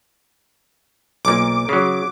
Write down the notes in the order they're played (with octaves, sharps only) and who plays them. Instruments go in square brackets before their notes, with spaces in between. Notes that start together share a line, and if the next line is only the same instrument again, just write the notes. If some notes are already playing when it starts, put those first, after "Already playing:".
[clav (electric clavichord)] B1 A#2 [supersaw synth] D6
[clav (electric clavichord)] C#3 F#3